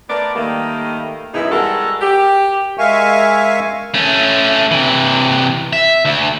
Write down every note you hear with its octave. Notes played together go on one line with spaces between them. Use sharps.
A3 B3 A#4 D5
D#3 G3 A3 A#3
F#2 B2 E3 D#4 E4 G#4
G3 G#3 F#4 A4 A#4
G4
G#3 A#4 E5 F5 G#5 C#6
A3 C#4
C3 E3
E5
D2